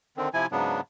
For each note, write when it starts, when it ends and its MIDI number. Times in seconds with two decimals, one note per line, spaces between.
0.17 0.29 50
0.17 0.29 51
0.17 0.29 60
0.34 0.46 48
0.34 0.46 53
0.34 0.46 64
0.34 0.46 80
0.52 0.81 44
0.52 0.81 49
0.52 0.81 54
0.52 0.81 59
0.52 0.81 62